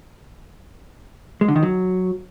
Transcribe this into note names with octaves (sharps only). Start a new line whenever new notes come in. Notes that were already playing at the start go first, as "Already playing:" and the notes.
G#3
D3
D#3
F#3